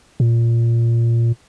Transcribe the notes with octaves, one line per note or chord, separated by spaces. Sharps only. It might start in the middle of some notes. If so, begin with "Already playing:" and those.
A#2